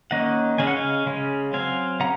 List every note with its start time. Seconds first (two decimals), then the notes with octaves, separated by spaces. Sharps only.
0.11 D#3 A#3 C#4 D#5 F#5
0.58 C#3 G#3 C#4 G#5
0.67 F#5
0.77 F5 G#5
1.06 C#3 G#3 C#4
1.53 F#3 C4 F5 G#5
2.00 C#3 F#5 A#5